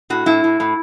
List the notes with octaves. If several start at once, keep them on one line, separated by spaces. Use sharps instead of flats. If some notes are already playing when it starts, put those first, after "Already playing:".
A2 F#4
A2 E4
A2
A2